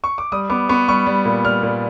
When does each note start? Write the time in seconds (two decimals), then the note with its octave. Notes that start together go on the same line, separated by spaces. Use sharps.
0.04 C#6
0.18 D6
0.32 G3 D#6
0.50 B3 D6
0.69 B3 C#6
0.88 G3 C#6
1.06 G3
1.25 A#2
1.44 G3 F6
1.63 A#2